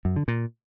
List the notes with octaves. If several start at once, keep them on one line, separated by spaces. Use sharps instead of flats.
F#2
D3
A#2